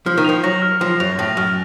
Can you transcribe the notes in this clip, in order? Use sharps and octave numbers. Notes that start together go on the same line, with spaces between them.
F3 F6
D#3
F3 F7
F#3 A#6
F6
F3 F6
F#2 F7
A2 A#6
F#2 F6